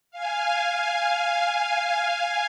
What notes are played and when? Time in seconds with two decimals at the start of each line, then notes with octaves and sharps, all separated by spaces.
0.11 F5 G#5